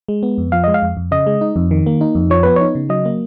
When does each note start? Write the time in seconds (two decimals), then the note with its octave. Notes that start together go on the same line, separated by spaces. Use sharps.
0.08 G#3
0.23 B3
0.38 F2
0.52 F3 F5
0.64 G#3 D#5
0.74 F5
0.82 F2
0.97 F2
1.11 C#3 D#5
1.27 G#3
1.41 D#4
1.56 F2
1.71 D#3
1.86 A#3
2.01 D#4
2.15 F2
2.30 F3 C#5
2.43 B3 B4
2.56 D#4 C#5
2.75 C#3
2.89 F#3 D#5
3.05 A#3